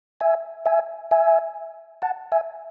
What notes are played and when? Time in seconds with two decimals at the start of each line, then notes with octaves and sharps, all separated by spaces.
0.21 E5 G#5
0.66 E5 G#5
1.11 E5 G#5
2.02 F#5 A5
2.32 E5 G#5